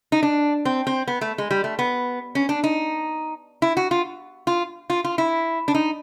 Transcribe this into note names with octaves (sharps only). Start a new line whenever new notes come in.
D#4
D4
C4
C4
B3
A3
G#3
G3
A3
B3
C#4
D4
D#4
E4
F#4
F4
F4
F4
F4
E4
D4
D#4